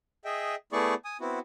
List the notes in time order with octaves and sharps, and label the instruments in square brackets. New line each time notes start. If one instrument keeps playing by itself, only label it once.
[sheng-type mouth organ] G#4 D#5 E5 G5
A3 B3 E4 G#4 D5 C#6
G#5 D#6
B3 C4 E4 F#4